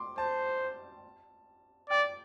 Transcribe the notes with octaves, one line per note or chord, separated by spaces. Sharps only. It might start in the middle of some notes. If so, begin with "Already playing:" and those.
Already playing: C6 D6
C5 A5
D5 G5